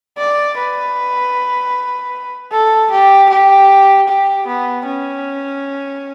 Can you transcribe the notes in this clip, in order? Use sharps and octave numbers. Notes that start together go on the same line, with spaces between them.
D5
B4
A4
G4
G4
G4
B3
C#4